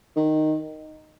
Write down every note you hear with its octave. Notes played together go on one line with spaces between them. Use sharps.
D#3